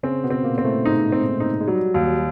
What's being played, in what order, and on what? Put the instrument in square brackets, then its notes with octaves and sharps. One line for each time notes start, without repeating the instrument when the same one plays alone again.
[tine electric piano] C#3 C#4 [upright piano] C4
[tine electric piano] B2 B3
[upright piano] C4
[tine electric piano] A#2 A#3
[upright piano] C4
[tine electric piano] A2 A3
[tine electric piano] G#2 G#3 [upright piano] D#4
[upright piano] C4
D#4
[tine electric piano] G#3
[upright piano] F#3 [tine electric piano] G3
[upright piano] D#2